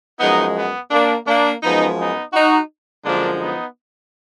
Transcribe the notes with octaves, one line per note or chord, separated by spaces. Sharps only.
F#2 F3 G#3 B3 D#4
B3
A#3 D4
A#3 D4
F#2 F3 G#3 B3 D#4
B3 D#4
D#4 F#4
F#2 D3 F3 G#3 A#3 D4
B3 D#4